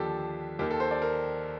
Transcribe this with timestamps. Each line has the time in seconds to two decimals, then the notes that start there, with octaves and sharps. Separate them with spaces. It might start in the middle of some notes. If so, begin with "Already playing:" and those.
Already playing: D#2 D3 F3 G4 A4
0.59 D#2 D#3 G4
0.70 A4
0.80 C5
0.91 D5
1.02 A#4